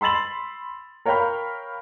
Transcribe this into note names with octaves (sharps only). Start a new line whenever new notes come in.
B5 C6 E6 A6 F#7
A#4 C#5 F5 G5 B5 F6